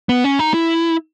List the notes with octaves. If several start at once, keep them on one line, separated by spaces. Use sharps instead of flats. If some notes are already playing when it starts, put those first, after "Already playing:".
B3
C#4
D#4
E4